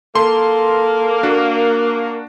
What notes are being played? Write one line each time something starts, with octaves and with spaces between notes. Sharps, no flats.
A#3 A4 C6
D4 F#4